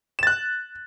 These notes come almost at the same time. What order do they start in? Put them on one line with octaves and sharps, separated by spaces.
E7 A6 F#6